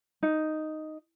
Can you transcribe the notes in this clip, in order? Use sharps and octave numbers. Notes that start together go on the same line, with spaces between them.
D#4